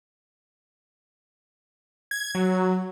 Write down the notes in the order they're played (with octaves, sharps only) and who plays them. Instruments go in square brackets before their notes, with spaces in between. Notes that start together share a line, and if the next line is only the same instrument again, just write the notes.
[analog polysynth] G#6
F#3